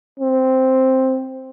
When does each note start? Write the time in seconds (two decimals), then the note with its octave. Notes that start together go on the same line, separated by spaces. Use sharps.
0.20 C4